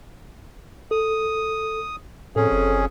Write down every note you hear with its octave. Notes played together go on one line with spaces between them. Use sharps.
A4 D#6
F2 A2 C#4 G#4 A4
F#1